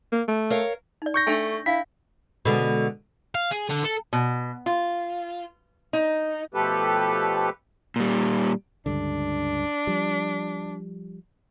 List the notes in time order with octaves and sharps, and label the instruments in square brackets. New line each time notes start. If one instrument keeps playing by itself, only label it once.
[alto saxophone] A#3
A3
[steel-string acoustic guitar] A#4 C#5 F5
[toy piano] D#4 D5
[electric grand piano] C#6 G6 A#6
[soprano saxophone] A3 [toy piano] D4 G#5
[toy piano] D4 F5 [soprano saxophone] E4 [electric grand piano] B6
[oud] B2 D3 G#3
[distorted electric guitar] F5
G#4
D3
A4
[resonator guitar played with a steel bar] B2
F4
D#4
[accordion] B2 F3 A3 G4 A4 B4
[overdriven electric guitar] A#2 G3
[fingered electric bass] C#2 G2 D3 [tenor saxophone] D4
[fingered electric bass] F3 G3